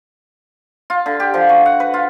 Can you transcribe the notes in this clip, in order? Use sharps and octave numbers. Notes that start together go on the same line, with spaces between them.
F4
D3
G4
F3
F#4
F#5
B4
F4